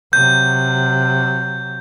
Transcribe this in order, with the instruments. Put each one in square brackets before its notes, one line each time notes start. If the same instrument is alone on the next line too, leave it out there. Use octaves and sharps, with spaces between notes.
[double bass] C3 F#3 [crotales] G6